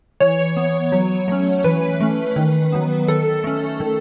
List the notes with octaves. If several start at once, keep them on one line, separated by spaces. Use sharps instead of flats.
E3 C#5
B3
F#3
A3 C#4
E3 B4
A3 C#4
D#3
F#3 B3
D#3 A4
A3 C#4
D#3